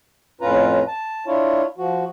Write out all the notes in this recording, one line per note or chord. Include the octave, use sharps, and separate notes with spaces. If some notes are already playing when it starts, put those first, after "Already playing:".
F2 A2 C#4 F4 B4 A#5
A5
D4 E4 F4 C#5
F3 F#4